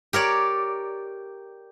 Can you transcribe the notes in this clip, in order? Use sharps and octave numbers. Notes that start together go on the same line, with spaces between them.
G4 A#4 C#5 D5